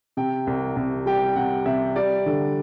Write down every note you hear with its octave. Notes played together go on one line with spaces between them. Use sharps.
C3 G5
C2
C2
G3 G5
C3 F#5
C3 E5
G3 D5
D3